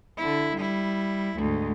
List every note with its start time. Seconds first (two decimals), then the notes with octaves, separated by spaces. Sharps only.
0.17 D3 E4
0.57 G3 E4
1.38 D2 G#2